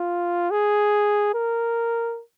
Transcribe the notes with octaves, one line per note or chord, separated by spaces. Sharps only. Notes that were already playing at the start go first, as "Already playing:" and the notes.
Already playing: F4
G#4
A#4